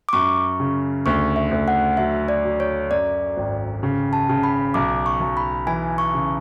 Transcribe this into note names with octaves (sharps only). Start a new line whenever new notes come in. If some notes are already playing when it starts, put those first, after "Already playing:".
D6
F#2 C#6
C#3
D2 C#6
E5
D2
F#5
F#3 E5
D5
F#3
C#5
F#2 D5
G#1
C#3
A5
C#3
B5
B1 D6
C#6
B1
B5
E3 G#5
C#6
C#3